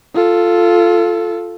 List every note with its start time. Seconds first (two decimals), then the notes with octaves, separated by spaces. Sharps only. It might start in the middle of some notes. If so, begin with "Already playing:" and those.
0.15 F4 A4